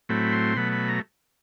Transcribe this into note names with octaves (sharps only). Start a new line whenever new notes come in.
A2 F#3 A3 C4 B5
C6
B2 F#3 A3 B5
B5
A#5